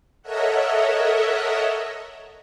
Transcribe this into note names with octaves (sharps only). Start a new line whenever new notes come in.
A4 A#4 C#5 D#5 E5 F#5